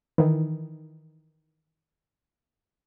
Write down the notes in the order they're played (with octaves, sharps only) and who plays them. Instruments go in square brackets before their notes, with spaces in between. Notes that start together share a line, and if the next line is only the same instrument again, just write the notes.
[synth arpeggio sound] D#3 E3